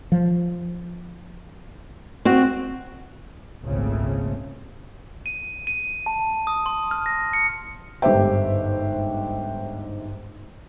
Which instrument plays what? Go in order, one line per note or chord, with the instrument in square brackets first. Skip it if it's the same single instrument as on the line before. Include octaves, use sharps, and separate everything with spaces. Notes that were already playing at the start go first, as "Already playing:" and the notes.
[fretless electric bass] F3
[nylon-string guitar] C4 F#4
[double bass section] G#1 C#2 A#2 C#3 A3 C4
[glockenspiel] D#7
D#7
A5
D#6
C6
F6
A#6
C#7
[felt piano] G1 G#2 G4 C5 E5 G5